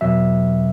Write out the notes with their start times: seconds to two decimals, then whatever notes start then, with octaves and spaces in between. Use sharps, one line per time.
0.01 E2 B2 F#3 E5